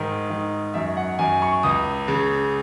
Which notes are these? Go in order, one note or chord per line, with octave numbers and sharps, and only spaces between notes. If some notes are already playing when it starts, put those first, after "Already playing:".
Already playing: G#2 D#3
D#3
F#2 E5
F#5
F#2 G#5
C#6
C#2 D#6
C#3